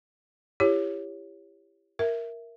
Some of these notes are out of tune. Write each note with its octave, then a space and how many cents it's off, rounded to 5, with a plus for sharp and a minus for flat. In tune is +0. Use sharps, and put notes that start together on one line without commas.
E4 +30 G4 +25 C#5 +0
A#4 +0 E5 +0